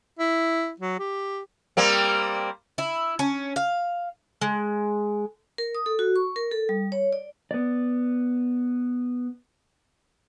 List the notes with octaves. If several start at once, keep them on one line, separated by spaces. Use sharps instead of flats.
E4
F#3
G4
G3 A#3 C4
E4
C#4
F5
G#3
A#4
D#6
A4
F#4
C#6
A#4
A4
G3
C#5
D5
B3 D5